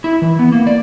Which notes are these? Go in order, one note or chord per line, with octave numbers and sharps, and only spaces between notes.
E4
E3
B3
A#3
D5